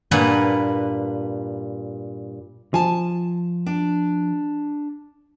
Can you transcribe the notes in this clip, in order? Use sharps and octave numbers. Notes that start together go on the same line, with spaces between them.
G2 A#2 A#3 B4 F#5 G#5
F3 G#5 A5
D4